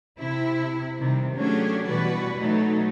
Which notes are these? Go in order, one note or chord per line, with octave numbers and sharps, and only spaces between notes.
C3 E4
C3 D#3 G3
F#3 A3 C#4 D4 G4 G#4
B2 E3 G3 F#4 B4 D5
B2 F#3 A3 D#4